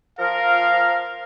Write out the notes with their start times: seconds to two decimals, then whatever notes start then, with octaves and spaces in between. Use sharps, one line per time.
0.19 F3 A#4 F5